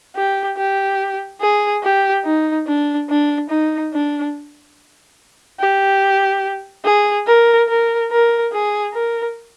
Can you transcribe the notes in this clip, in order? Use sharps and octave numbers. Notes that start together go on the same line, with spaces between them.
G4
G4
G#4
G4
D#4
D4
D4
D#4
D4
G4
G#4
A#4
A#4
A#4
G#4
A#4